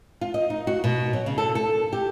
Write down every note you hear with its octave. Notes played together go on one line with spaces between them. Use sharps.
F4
D#5
D#4
F#4
B2
F#3
C#3
A4
A4
G4